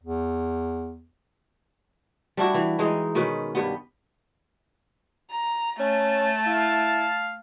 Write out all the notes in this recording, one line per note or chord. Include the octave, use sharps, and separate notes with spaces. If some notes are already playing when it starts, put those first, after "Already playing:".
E2
G3 D4 E4 F#4
E3
E3 G#3 D#4
B2 D#3 C#4 B4
G2 G3 B3
A#5
A3 C#4 A5
E4 F5